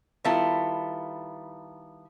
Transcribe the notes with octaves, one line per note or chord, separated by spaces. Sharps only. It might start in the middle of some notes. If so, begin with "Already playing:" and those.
D#3 G3 B3 E4 F4 A4